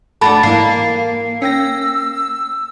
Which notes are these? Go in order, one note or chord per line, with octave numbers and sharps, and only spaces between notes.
A3 D4 F#4 A4 A5 B5 A6
G#2 E3 A#3 C7
C#4 G5 E6 A#6